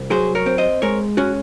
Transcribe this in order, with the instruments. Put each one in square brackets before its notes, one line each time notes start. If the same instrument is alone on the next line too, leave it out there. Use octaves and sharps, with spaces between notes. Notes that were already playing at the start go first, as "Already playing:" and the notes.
Already playing: [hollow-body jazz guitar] C2
F#3 G#4 C5
A#4 C#5
C4
C5 D#5
G#3 A#4 C#5
C#4 F#4